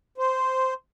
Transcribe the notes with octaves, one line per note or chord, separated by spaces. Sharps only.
C5